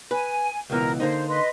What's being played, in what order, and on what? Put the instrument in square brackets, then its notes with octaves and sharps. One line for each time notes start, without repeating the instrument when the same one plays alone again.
[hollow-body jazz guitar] B4 [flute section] G#5
[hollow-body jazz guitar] C#2 B2 E3 [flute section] A#4
[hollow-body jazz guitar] D3 A#3 D#4 [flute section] C5
[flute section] B4 D#5 C6